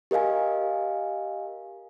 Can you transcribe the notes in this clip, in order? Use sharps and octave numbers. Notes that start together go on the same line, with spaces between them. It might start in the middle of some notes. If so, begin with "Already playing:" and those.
G4 A#4 D#5 F5 G#5